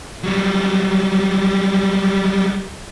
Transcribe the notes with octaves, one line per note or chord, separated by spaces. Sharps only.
F#3 G3